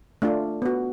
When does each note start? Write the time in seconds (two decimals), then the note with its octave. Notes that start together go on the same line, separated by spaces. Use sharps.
0.22 A3 D4 F4
0.62 B3 F#4